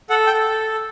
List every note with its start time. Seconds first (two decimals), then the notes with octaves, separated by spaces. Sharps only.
0.10 A4 F#5
0.27 G5
0.34 A4